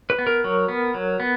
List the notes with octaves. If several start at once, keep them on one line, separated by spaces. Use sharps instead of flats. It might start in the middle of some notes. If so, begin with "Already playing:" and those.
B4
B3
A#4
F#3
B3
F#3
B3